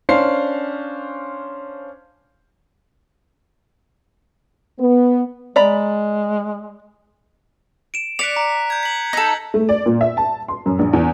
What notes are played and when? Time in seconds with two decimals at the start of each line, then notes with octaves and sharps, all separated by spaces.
0.09 C#4 D4 C5 F5 C7
4.79 B3
5.56 G#3 D5 A#5 B5
7.94 D7 E7
8.19 D5 F#6 B6 C#7 F7
8.36 A#5
8.70 G6 G#6
8.83 B6 F#7
9.13 D#4 A4
9.54 A3
9.69 D5
9.86 A#2
10.01 E5
10.17 A5
10.48 C6
10.66 F#2
10.79 A#1
10.93 E2